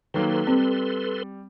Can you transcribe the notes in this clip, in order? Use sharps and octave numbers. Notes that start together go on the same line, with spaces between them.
D#3 F#3 A#3 A4 B4 C6
G3 C4